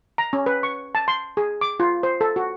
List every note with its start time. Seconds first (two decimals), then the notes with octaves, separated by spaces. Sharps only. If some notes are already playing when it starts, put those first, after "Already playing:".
0.18 A#5
0.33 C#4
0.46 B4
0.63 C#6
0.95 A5
1.08 C6
1.37 G#4
1.61 D6
1.80 F4
2.03 C5
2.21 A4
2.36 F#4